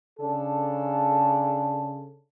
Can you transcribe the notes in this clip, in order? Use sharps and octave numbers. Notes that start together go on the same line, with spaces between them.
C#3 D4 A4